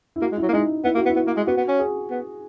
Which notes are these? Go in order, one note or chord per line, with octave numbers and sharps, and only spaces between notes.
E4
A#3 F#4
G#3
E4
F#3
A#3
G#3 D#4
B3 E4
A#3 F#4
B3
E4
B3
A#3
G#3
B3 F#4
B3
C#4
G#4
B3